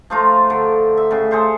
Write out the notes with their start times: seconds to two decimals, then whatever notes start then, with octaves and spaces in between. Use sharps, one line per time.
0.10 F3 A3 F4 A#5
0.50 D3
0.97 E5
1.11 A2 C#3
1.31 G#4 A4 C5 F5